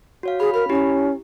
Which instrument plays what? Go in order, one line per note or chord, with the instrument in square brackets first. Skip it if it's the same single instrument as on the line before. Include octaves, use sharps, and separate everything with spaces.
[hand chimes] F#4 C#5 F5
[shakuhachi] G#4 [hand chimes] B5
[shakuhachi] A#4 [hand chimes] B5
[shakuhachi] C#4 [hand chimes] E4 G4